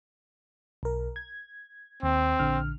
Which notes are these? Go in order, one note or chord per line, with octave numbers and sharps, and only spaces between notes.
B1 A#4
G#6
D#2 C4
A#1 D3 F6